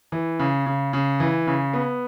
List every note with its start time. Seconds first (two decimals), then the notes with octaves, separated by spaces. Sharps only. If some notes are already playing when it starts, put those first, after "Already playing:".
0.12 E3
0.39 C#3
0.66 C#3
0.93 C#3
1.20 E3
1.47 C#3
1.73 B3